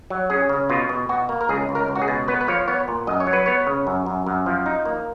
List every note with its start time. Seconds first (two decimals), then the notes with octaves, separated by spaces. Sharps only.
0.10 F#3
0.30 C#4 G#4
0.49 C#3
0.69 B2 F4
0.89 B2
1.09 B2 F#4
1.29 A#3
1.41 A#4
1.49 C#2 G#4
1.69 C#2
1.75 A#4
1.88 C#2
1.96 F#4
2.02 G#4
2.08 B2
2.28 B3 B4
2.41 B4
2.48 F3 C#5
2.68 B3 C#5
2.88 A#2
3.07 F#2 D#5
3.20 C#5
3.27 F#3
3.33 B4
3.46 B3 C#5
3.67 C#3
3.87 F#2
4.06 F#2
4.27 F#2
4.46 F3
4.66 D#4
4.85 A#3